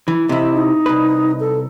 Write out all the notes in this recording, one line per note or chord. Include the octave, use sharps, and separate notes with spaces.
E3
C3 E4 D#5
D#4
C2 B4
A4